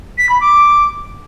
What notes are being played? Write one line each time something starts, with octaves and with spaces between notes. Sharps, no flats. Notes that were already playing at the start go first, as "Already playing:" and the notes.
B6
B5
D6